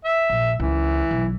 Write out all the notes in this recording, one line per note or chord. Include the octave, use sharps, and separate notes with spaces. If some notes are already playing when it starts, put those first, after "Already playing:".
E5
A#1
C#2 E3
B1